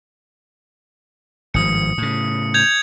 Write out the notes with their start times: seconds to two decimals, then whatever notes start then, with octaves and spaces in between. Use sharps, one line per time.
1.54 G#1 G2 F3 D#6 C#7
1.98 A2 C#3
2.54 G6 G#6 F7